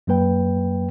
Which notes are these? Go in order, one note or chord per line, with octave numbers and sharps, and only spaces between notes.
F#2 F#3 A#3 B4 G5